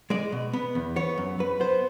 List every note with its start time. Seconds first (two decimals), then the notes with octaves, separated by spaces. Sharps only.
0.10 G#3 D5
0.32 B2
0.53 B3
0.75 E2
0.96 B3 C#5
1.18 F#2
1.39 F#2 B4
1.60 B3 C5